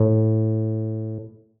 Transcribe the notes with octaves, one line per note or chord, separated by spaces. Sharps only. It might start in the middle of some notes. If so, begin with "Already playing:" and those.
Already playing: A2